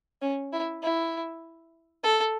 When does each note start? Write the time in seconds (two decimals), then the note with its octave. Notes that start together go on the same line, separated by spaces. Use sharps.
0.22 C#4
0.53 E4
0.83 E4
2.04 A4